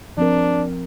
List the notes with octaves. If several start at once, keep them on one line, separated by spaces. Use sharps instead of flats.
F3 C4 D4 A#4